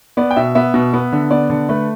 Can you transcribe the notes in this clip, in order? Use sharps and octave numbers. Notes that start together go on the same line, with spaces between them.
B3 D5
G5
B2 E5
B3 E5
B2
B3
D3
B3 D5
D3
A3 B4